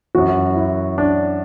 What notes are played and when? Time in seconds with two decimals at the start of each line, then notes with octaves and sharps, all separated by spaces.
0.15 F#2 E3 F#4
0.56 E4
0.98 D4